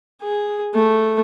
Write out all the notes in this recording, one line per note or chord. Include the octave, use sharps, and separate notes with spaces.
G#4
A3